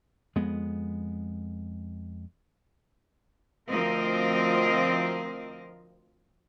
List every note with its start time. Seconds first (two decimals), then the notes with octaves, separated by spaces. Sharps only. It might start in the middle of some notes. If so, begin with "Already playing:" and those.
0.36 F2 G#3 B3
3.70 D2 F3 C4 A#4 D#5